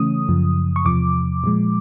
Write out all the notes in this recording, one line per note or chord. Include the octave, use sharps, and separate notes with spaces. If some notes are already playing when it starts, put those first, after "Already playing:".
Already playing: C#3 E3 A3 C#4 D#6
F#2 C#3 F3
C#6
E2 C3 F3 D6
A#2 F3 G#3